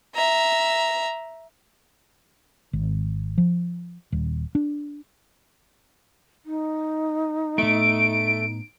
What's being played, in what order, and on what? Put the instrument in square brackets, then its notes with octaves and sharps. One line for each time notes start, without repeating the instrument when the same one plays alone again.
[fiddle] E5 A#5
[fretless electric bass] G#1
F3
D#1
D4
[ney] D#4
[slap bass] A2 B3 [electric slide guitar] A3 [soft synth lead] D7